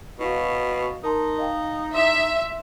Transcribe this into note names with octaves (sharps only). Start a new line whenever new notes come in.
B2 E4 F#4 F5
D#4 A#4 A5 C6
D#5 F5 G5
E4 E5 C6